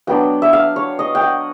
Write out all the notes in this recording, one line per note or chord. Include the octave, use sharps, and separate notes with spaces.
F#3 B3 D4 G5
E5
F5
C#5
D#5
G5
F#5